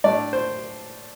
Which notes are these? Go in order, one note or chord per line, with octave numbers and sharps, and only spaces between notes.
A2 A3 D4 D5
C5